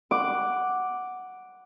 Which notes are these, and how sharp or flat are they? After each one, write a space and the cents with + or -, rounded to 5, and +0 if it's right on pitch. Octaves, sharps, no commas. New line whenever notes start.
F#5 +0 D6 +0